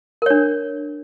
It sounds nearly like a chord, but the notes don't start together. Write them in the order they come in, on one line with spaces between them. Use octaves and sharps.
A#4 C#5 D4